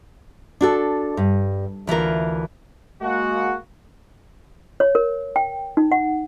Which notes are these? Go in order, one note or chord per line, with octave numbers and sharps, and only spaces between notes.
D4 F#4 A4
G2
D2 E3 F4 A#4
G#3 A#3 F#4 F#5
C#5
A#4
G5
D#4
F#5